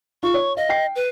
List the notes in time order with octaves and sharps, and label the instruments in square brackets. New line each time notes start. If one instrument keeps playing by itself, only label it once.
[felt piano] F4 [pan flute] C#6
[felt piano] C#5
[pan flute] D#5 [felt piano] F5
[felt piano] G5 C7
[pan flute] B4